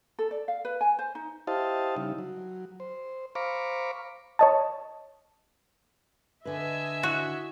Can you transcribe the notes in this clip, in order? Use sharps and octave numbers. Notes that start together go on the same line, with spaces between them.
A4
D5
F5
B4
G#5
C5
D#4
E4 G4 C5 D#5 F5 A5
C#3 G3 D#4 E4
F#3
C5
C5 F5 A#5 B5 C#6 D6
C#5 D#5 A5
D3 B4 D#5 E5 G#5
E4 F#4